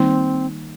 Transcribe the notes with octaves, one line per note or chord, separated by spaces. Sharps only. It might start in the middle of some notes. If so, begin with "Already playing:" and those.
Already playing: D#3 G3 A#3 C4 D#4